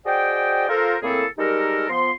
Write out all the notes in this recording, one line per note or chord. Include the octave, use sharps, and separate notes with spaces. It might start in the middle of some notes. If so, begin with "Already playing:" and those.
F#4 G#4 C5 D5 D#5 G5
F4 A4 A#4 C5
A2 A#3 C4 E4 G#4 A4
G3 G#3 D#4 G4 A4 A#4
F3 B3 C6